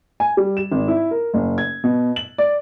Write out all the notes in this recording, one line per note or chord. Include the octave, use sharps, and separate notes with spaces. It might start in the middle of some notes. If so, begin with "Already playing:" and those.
G#5
G3
E7
G#1
E4
A#4
F#1
G#6
B2
F#7
D5